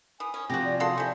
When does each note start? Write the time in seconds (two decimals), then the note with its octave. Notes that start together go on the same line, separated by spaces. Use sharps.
0.20 E3 G#5 D#6
0.34 C#4
0.50 C3 F3 F#4 G4 A#6
0.64 D5
0.80 F#4 A4 F5 C6 D#6
0.98 E4 C#5 G#5 G6